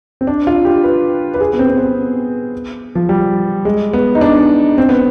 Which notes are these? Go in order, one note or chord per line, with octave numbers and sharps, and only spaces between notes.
C4
D4
F4
G4
B4
B4
G#4
B3
C4
C4
B3
F3
G3
G#3
B3
D#4
D4
C4
B3